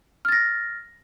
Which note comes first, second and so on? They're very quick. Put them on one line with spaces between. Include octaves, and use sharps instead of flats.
F6 A6 A#6